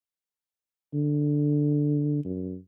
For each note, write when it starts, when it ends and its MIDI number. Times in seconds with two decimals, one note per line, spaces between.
0.94 2.24 50
2.25 2.56 42